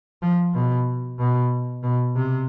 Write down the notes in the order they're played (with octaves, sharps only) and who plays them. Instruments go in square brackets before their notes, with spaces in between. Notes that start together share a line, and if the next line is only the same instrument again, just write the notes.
[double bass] F3
B2
B2
B2
C3